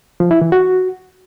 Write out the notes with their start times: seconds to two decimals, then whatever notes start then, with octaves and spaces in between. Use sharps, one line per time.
0.20 F3
0.31 E4
0.41 E3
0.52 F#4